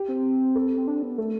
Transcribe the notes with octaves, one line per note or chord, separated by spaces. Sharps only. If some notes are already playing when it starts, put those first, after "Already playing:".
Already playing: G4
C4
A4
C4
D4
B3
A3 A4